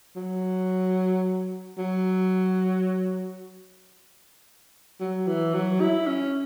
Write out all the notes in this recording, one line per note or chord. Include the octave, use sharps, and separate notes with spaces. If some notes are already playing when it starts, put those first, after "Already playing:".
F#3
F#3
F#3
E3
F#3
E4
C#4